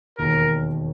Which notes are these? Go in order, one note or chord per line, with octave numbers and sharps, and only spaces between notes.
E1 D#2 D#3 A#3 A#4